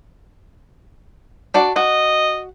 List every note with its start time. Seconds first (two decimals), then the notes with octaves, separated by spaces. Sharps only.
1.54 D4 F#4 D5
1.76 F#4 D#5